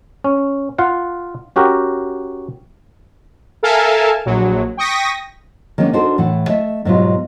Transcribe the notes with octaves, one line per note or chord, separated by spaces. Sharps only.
C#4
F4 F5 F#5
C#4 F#4 G4 A#4
A4 A#4 E5 F5 G#5 A5
A#1 F#3
G5 C#6 D#6 A#6 B6
D#3 G#3 A#3 B3 C#4 D4
D4 D#4 F#4 A4 A#4 C5
A2 E3 A4 F#5
A3 D#5 E5
G#2 B2 F#3 G3 B3 F4